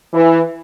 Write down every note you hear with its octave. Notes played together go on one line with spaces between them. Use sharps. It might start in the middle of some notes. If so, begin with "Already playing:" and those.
E3